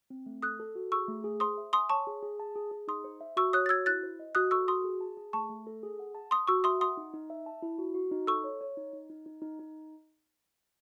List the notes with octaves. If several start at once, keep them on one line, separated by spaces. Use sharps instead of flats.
C4
A3
A4 D#6 F#6
A4
F#4
G#4 C#6 E6
A3
G#4
C5 C6 D#6
E5
G#5 C6 D#6
C#5 A5 C#6
G#4
G#4
A5
G#4
G#4
D#4 C6 D#6
C5
E5
F#4 C#6 E6
C#5 D#6 F#6
A6
F#4 E6 G#6
E4 F#6 A6
C5
D#5
F#4 D#6 F#6
A4 C#6 E6
F#4 C6 D#6
G#4
A5
G#4
A3 A5 C#6
A3
A4
G#4
F#5
A5
A5 C6 D#6
F#4 C#6 E6
E5 C6 D#6
F#5 C6 D#6
D#4
D#4
E5
A5
E4
F#4
F#4
D#4
A4 C#6 E6
C#5
C#5
D#4
D#4
D#4
D#4
D#4
D#4